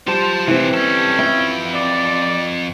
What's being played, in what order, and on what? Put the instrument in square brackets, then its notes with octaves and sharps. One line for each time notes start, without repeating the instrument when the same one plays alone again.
[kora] G3 [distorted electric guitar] F4 A5 [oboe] C5
[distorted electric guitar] C3 F3 [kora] E3 C4
[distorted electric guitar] G3 A4 [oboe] C#4
[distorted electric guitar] F2 G5 [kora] E4
[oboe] D5